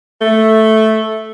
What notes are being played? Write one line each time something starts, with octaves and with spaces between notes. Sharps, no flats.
A3